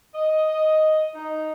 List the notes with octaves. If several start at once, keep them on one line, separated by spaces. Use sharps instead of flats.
D#5
D#4